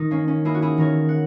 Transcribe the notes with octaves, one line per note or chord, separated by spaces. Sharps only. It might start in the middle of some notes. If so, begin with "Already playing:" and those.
Already playing: D#3 D#4
A#3 C#4
C#4
A#3 E4 G#4
F#4
E4 G#4
D#3 A#4 C#5
F#5